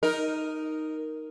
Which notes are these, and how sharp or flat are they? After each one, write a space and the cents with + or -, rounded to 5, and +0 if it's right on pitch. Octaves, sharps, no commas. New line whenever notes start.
D#4 +0 A#4 +0